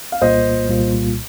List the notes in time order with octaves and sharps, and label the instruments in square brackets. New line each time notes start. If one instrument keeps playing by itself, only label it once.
[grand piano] F5
[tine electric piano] C2 A#2 G3 A#3 F4 [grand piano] C5 D#5
[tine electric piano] C2 A#2 G3 A#3 F4